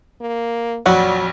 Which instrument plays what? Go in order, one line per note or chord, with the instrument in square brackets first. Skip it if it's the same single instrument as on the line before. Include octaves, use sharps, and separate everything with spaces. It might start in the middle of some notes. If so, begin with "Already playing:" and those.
[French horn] A#3
[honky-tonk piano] A#1 F2 [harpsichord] F#3 [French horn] D5 [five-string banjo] F#5